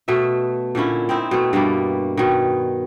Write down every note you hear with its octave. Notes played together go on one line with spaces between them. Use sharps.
B2 A3 E5
A#2 D3 C#4 E4
C4 D#4 E4
B2 A3
G2 B2 G3 A#3
B2 D#3